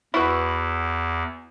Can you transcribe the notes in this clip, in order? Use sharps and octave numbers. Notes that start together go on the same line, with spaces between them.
E2 E4 F#4 B4